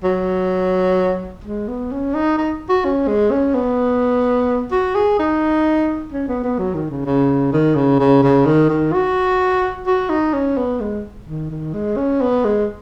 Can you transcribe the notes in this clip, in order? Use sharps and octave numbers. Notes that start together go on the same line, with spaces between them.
F#3
G#3
B3
C#4
D#4
D#4
F#4
C#4
G#3
C#4
B3
F#4
G#4
D#4
C#4
B3
B3
F#3
D#3
C#3
C#3
D#3
C#3
C#3
C#3
D#3
D#3
F#4
F#4
D#4
C#4
B3
G#3
D#3
D#3
G#3
C#4
B3
G#3